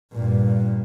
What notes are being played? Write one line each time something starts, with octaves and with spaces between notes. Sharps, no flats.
G2 A#2